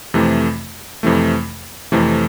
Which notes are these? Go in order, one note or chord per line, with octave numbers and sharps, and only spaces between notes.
F2 C3 E3 A3
F2 C3 E3 A3
F2 C3 E3 A3